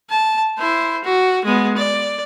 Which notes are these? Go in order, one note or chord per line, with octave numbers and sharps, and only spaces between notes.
A5
E4 C5
F#4
G#3 B3
D5